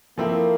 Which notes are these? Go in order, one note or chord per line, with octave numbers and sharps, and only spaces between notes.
F3 A#3 C4 E4 A4